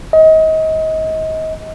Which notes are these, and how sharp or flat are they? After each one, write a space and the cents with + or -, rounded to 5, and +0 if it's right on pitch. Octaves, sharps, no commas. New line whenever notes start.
D#5 +30